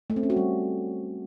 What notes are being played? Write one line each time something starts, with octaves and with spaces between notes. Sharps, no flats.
A3
C4
C#4
F#4
G3